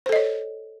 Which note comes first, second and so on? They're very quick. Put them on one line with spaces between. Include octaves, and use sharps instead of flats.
C5 A4 D#5 C#5